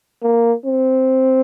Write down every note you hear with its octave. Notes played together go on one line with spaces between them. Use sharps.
A#3
C4